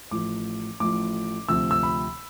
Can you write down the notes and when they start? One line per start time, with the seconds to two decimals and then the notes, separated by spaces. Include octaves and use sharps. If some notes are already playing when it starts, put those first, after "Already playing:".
0.11 A1 A2 F3 D6
0.80 A1 A2 F3 D6
1.48 D2 C3 F3 C4 E6
1.71 E6
1.83 B5